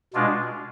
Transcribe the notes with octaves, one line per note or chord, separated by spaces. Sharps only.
B2 G#3 D4 F4